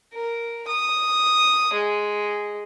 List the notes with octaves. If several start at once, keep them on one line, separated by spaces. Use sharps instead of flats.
A#4
D#6
G#3